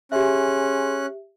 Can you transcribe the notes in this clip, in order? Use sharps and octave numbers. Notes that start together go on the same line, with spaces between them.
C#4 G4 G#4 E5 G#5 C6 F#6